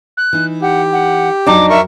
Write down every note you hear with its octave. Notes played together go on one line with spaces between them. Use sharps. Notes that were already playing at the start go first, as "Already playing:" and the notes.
F#6
E3 D#4
G4 F#5
F#5
F2 F#3 D4 D#4 G5 D6
A#4 E5 C#6